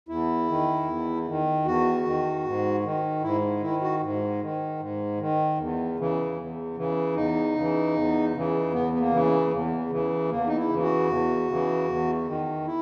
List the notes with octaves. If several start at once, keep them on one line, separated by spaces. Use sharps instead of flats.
E2 E4
D#3
E2
D#3
E2 F#4
D#3
G#2
D#3
G#2 E4
D#3 E4
F#4
G#2
D#3
G#2
D#3
E2
C#3 E3
E2
C#3 E3
E2 D#4
C#3 E3
E2
C#3 E3
E2 B3
B3
A#3
C#3 E3
E2
C#3 E3
E2 A#3
D#4
E4
C#3 E3
F#4
E2
C#3 E3
E2
D#3
E4